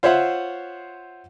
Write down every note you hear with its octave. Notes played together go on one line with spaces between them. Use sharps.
F4 C5 C#5 E5 F#5